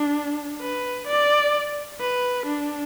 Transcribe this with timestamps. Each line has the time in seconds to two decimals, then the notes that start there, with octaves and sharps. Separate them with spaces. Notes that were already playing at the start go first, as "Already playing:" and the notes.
Already playing: D4
0.62 B4
1.07 D5
2.00 B4
2.46 D4